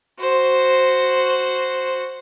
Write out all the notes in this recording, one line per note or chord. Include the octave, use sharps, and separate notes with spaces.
F#4 C5